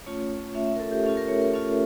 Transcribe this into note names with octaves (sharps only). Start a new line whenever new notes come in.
A3 C#4 F4 C#5
A3 C#4 F4 E5
E5
A#4
A4
G4
A3 C#4 F4 A4
A#4
C#5
A#4
A3 C#4 F4 A4